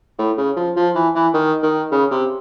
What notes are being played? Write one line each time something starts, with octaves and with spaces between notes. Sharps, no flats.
A2
C#3
F3
F3
E3
E3
D#3
D#3
C#3
C3